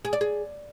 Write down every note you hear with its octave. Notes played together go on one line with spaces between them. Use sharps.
G#4
D5
G#4